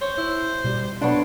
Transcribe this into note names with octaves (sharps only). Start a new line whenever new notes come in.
C5 C#5
E4
B2 G3
B3 D4 C#5 C6